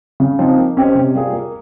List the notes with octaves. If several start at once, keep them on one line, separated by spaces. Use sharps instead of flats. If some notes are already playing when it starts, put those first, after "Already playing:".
C#3
F3 C4 D#4
A#3
C#4 G4 C5 D#5
C3
G3 A#3 F4 G#4
A#3